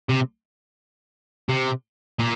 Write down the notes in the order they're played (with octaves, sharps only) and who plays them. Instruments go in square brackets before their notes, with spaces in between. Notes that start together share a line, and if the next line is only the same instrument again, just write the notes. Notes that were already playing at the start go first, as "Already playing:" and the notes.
[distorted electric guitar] C3
C3
A#2